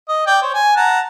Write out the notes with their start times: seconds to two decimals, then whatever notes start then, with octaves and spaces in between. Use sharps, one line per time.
0.08 D#5
0.27 D5 G5
0.42 C5 C#5
0.54 G#5
0.76 F#5 A5 A#5